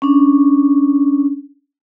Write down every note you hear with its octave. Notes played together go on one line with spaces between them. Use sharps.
C#4 D4